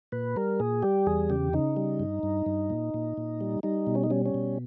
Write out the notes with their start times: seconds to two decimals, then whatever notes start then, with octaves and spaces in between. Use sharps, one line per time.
0.12 A#2 B4
0.36 G3 A#4
0.60 A#2 G#4
0.83 G3 G4
1.07 E2 G#4
1.30 C#3 G4
1.53 C#3 D#4
1.76 G3
2.00 G2
2.23 G2
2.46 G2
2.70 A#2
2.94 A#2
3.17 A#2
3.41 G3
3.63 G3 D#4
3.87 B2
3.95 C#4
4.03 D#4
4.10 G3 C#4
4.26 C#4
4.34 B2